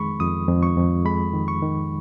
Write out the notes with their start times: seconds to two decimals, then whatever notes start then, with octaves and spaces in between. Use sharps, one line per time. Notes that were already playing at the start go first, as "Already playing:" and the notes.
Already playing: F2 D#3 G#3 B5 C#6
0.20 F2 D#6
0.49 F2
0.63 C#6
0.77 F2
1.05 G#3 B5
1.34 D#3
1.48 C#6
1.63 D#3